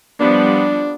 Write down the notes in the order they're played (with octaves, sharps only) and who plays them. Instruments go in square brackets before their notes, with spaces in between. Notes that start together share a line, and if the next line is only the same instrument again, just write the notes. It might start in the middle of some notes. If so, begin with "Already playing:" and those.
[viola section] F3 G3 B3 [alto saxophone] D4